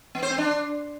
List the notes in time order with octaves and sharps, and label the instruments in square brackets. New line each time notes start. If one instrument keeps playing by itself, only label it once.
[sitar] B3
C5
C4
D4